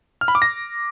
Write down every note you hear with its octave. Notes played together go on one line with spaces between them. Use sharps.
F6
B5
D6
A#6